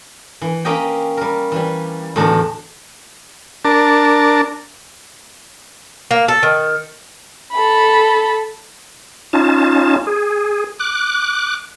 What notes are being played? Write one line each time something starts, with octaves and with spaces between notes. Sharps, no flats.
E3
A#3 C#4 G4 D#5 G5
G3 A#4
E3 G3
E2 A2 D3 D4 D#4 F#4
D4 A#4 A5
A#3
A4
D#3
A4 B5
C#4 D#4 F4 A5
G#4
D6 F#6